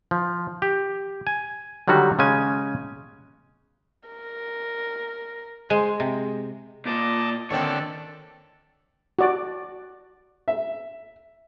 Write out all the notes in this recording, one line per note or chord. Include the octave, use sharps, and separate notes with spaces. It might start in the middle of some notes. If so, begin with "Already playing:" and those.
F3
G4
G#5
D3 D#3 F#3 G3 F#4
C#3 G#3 C#4 G#5
A#4
G#3 C5
C3 G#3
A#2 A#3 D#5 A5 D6
D3 D#3 C4 D4 A4 C#5 D5
F#4 D5
E5